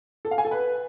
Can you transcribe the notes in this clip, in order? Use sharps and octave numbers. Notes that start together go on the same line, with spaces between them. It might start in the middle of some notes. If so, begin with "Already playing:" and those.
A4
F5
G#5
A4
B4